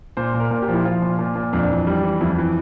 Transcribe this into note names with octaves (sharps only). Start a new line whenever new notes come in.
A#2 C5
A#2
A#4
A#2
G4
F3
E4
F3 F4
A#2
A#2
A#2
F2 D4
E3
G3
E3
F2 E4
E3